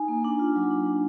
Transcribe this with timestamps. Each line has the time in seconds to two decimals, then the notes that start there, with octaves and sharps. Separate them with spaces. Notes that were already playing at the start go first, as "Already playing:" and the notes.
Already playing: D#4 G#5
0.08 A#3
0.24 D4
0.39 F4
0.56 F#3
0.71 D4
0.87 D4